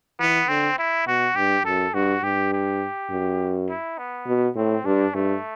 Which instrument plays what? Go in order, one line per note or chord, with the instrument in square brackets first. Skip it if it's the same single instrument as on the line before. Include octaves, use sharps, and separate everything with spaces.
[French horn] E3 [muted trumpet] B3
[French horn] D3 [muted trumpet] C4
[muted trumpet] E4
[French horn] B2 [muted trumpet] F#4
[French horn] G2 [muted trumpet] G4
[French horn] F#2 [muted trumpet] A4
[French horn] G2 [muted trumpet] F#4
[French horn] G2 [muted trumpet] G4
[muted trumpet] G4
[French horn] F#2
[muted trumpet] E4
B3
[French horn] B2
[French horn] A2 [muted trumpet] C4
[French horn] G2 [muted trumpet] D4
[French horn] G2 [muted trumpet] A3